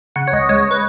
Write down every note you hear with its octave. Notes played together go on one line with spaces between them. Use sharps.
C#3 F#5
C#5
C#2 D#5
G#3 C#5
B4